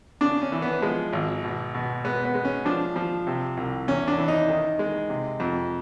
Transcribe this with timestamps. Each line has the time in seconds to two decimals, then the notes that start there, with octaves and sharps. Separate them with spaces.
0.21 C#3 D4
0.42 C#4
0.52 E3
0.62 B3
0.82 F3 G#3
1.13 G#1
1.44 B2
1.74 B2
2.04 G#3 B3
2.25 B3
2.35 G#3
2.45 C#4
2.65 F3 D4
2.96 F3
3.27 C3
3.57 C2
3.88 E2 C#4
4.08 D4
4.18 E3
4.28 D#4
4.49 D#3
4.79 G#3
5.09 C3
5.40 F2